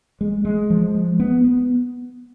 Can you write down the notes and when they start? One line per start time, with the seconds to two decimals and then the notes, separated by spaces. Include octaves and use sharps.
0.21 G#3
0.45 G#3
0.70 F3
0.94 G#3
1.20 B3
1.44 B3